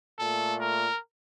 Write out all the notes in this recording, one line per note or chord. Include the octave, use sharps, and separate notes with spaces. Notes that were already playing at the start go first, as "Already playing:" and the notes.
A#2 A3 A4
A#4